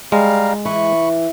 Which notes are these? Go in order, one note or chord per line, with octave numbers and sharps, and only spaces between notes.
G3 G#3 F5 A#5
E3 B5 C#6